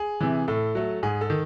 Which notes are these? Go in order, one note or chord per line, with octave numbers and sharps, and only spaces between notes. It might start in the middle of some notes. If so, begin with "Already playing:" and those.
Already playing: G#4
C3 E3
A2 A4
F#3 A3
G#2 G#4
A4
D#3